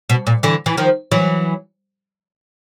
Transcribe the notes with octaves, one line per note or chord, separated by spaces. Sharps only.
B2
A#2
D3 E3
E3
D#3 F3
E3 F#3